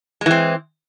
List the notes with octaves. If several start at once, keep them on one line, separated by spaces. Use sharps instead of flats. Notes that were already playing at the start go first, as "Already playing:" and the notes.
E3 G#3 C4